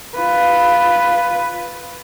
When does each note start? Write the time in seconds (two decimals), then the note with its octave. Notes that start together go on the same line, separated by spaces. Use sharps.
0.16 F4 B4